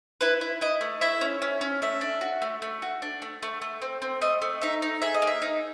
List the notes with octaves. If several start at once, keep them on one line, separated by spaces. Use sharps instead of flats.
E4 B4
E4
E4 D#5
A3
E4 E5
C#4
C#4
C#4
A3 E5
D4
F#4
A3
A3
F#4
D4
A3
A3
A3
C4
C4
A3 D#5
A3
D#4 E5
D#4
G#4 E5
D#5
A#3
E5
D#4